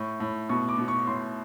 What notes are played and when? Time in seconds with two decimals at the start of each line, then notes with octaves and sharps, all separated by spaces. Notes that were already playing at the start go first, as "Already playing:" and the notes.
Already playing: A2 C#6
0.20 A2
0.49 B2 C#6
0.69 D6
0.78 B2
0.88 C#6
1.07 A2 C6